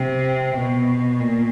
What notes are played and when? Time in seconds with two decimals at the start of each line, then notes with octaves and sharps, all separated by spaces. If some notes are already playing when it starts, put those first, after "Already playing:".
Already playing: C3
0.57 B2
1.21 A#2